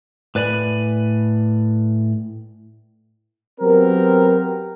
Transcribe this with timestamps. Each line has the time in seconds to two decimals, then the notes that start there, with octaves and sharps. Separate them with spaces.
0.35 A2 B4 D5 G#5 B5
3.60 F#3 B3 C4 G4 A#4